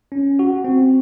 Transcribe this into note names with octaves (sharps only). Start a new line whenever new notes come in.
C#4
F#4
C4